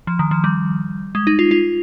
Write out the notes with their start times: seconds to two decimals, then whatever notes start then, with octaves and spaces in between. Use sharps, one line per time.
0.07 F3
0.19 D#3
0.31 F3
0.44 G3
1.15 G#3
1.27 D#4
1.39 F4
1.51 F4